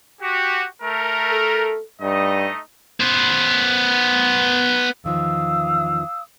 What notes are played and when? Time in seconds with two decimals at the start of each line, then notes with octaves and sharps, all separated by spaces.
0.21 F#4 G4
0.83 A3 A#4
1.31 A4
2.02 G2 A3 D#4 D#5
3.00 B3 C5
5.04 E2 D#3 F3 F5 D#6 E6